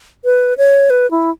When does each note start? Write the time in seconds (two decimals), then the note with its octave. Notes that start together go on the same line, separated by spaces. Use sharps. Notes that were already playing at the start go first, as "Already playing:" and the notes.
0.25 B4
0.58 C#5
0.90 B4
1.11 E4